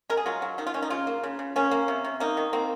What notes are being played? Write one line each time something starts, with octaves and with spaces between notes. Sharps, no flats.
G#3 A#4
G#4
F#3 F4
F#3
D#3 D#4
F4
D#3 C#4
D#4
C#3 F4
A#3
C#3
C#3
A#3 C#4
A#3
C3
C3
A#3 D#4
D#3
A#3 C4